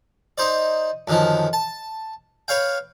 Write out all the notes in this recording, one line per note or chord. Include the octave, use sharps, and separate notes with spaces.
D#4 C5 D5
F#2 D3 D#3 F3
A5
B4 C#5 F5 G5